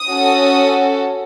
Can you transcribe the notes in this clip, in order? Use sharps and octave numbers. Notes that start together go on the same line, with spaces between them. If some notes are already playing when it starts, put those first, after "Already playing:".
Already playing: D#6
C#4 F#4 A4